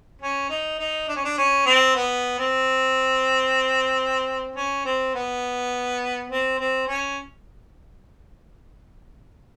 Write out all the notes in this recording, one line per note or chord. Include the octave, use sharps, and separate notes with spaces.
C#4
D#4
D#4
D4
C#4
D4
C#4
C4
B3
C4
C#4
C4
B3
C4
C4
C#4